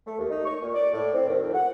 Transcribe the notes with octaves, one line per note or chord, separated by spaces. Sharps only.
A3
D#2
D#4
C#6
A#2
D5
A2
C4
D#2
F2
F#5